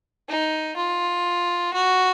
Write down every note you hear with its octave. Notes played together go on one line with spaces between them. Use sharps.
D#4
F4
F#4